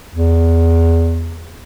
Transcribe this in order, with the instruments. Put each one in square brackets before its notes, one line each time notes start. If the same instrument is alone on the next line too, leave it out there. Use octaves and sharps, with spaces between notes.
[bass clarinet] E2